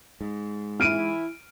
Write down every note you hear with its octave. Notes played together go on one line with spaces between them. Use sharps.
G#2
E3 E4 F6 D7 D#7